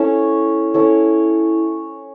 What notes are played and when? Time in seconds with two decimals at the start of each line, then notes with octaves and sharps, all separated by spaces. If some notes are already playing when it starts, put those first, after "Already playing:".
Already playing: C#4 E4 A4 C#5
0.74 C#4 E4 A4 C#5